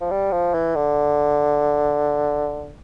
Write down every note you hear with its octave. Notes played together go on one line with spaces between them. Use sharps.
F3
G3
F3
E3
D3